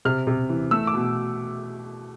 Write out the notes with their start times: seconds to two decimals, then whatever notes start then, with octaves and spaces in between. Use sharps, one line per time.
0.05 C3 F6
0.27 C3
0.49 E3
0.71 A3 E6
0.87 D6
0.94 B2